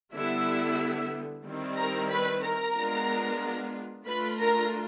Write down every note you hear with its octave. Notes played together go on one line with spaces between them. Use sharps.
D3 G3 B3 E4 E5
D#3 G3 C4 E4
A#4 A#5
B4 B5
A#4 A#5
G#3 B3 D4 F4
A3 D4 F4 B4 B5
A#4 A#5